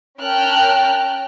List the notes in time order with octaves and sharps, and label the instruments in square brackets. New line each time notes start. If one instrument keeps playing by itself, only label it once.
[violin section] C#4 A#4 G5 A5 F6 F#6